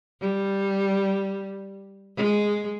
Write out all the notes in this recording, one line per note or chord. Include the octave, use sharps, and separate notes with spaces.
G3
G#3